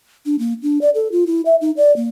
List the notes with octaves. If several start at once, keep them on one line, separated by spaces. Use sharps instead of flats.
D4
A#3
D4
D5
A4
F4
E4
E5
D#4
D5
A#3